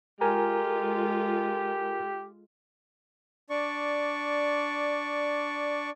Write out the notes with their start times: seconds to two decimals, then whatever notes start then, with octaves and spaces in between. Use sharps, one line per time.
0.21 G#3 F4 G4 A4 A#4 G#5 A#5
3.50 D4 D5 C#6